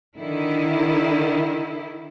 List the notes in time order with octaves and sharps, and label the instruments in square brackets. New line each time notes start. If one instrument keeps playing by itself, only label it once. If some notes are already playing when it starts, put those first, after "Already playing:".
[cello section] D3 D#3 E4